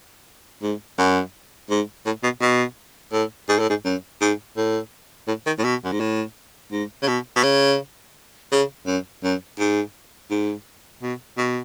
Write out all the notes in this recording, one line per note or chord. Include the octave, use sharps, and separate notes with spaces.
G#2
F#2
G#2
A2
B2
B2
A2
G#2
A2
G#2
F#2
G#2
A2
A2
D#3
A2
B2
F#2
G#2
A2
G#2
C#3
B2
B2
C#3
C#3
F#2
F#2
G#2
G#2
B2
B2